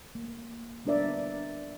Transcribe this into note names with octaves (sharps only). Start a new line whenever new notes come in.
A#3
G3 B3 D4 A#4 D5 E5